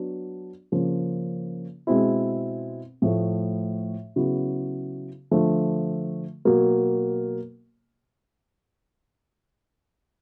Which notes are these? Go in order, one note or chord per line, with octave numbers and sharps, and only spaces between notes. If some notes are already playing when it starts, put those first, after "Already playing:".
Already playing: F#3 B3 D4
C#3 F3 A#3 C#4
B2 G#3 C4 E4
A2 F3 A3
C#3 F#3 B3 E4
D3 F3 A3
B2 F#3 A#3